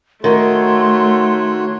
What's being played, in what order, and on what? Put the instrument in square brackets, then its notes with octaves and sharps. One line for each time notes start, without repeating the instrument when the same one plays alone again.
[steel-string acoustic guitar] D#3 [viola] A3 [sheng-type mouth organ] F#4 C#5 [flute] C6